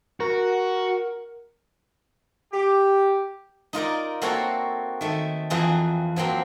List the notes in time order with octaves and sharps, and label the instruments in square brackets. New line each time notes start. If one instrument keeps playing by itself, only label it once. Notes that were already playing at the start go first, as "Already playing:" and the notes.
[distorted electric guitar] F#4 [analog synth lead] A#4
[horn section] G4
[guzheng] D#4 F4 A#4 D5
A#3 C4 F#4 A4 C#5 A#5
D#3 A3
F2 E3 F4 G#4 G5 A#5
F3 F#3 A#3 C4